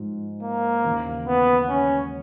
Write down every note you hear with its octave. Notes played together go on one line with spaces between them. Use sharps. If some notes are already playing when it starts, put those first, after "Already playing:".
Already playing: G#2 F3 G#3
A#3
D#2 C#3 E3
B3
C#4